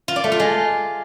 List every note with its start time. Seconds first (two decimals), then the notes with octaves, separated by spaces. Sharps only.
0.08 F4
0.16 D5
0.24 A3
0.32 F4
0.40 G#3